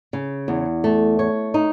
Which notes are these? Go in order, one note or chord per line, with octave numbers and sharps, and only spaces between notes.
C#3
E2
A3
C#5
D#4